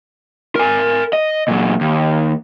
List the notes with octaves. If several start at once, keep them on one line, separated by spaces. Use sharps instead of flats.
A#4 G#5
D#5
A#2 F#3
D#2